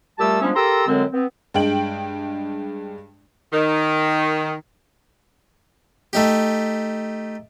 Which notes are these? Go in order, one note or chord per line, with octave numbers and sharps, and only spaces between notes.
A#2 G3 A3 G4 A5 E6
F3 G3 G#3 B3 C#4 D4
G4 A4 A#4 A#5 C6 E6
F#2 D3 F#3 G#3 C4
B3 C4
G2 G#3 G5 F#7
D#3
A3 D#4 G4